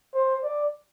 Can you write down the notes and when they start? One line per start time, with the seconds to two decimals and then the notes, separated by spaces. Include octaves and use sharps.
0.14 C5
0.43 D5